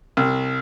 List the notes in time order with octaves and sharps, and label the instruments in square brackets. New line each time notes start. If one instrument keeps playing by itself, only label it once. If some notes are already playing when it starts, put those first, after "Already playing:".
[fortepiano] C2